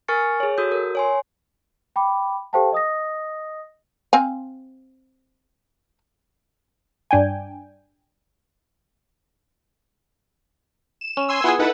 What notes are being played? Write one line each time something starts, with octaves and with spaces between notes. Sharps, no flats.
A#4 G#5 C#6 F6 A6 C#7
G#4 C#5
F#4 A4 D#6 E6 G6
A#4
C#5 G#5 C6
G5 B5 D6
G4 A4 C5 F5 G5 A5
D#5 D#6 A#6
C4 F5 G#5
G2 D4 G5 G#5
E7
C#4
G#5 C6 E6
B3 E4 F4 G#4 F#5
D#4 E4 A4 B4 F#5